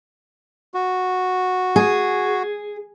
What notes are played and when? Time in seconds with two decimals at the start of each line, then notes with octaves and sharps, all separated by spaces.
0.74 F#4
1.76 G#4